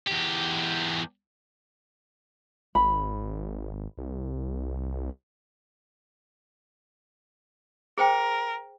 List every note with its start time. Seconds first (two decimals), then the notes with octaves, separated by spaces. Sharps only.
0.07 E2 G4
2.75 G#1 B5
3.98 C2
7.98 G#4 A#4 C5 G5